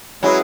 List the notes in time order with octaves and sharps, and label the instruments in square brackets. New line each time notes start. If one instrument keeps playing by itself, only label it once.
[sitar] F#3 [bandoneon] G#3 C#4 E4 G#4 B4